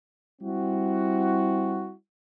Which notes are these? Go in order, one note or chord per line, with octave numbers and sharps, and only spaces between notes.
G3 C4 E4 F#4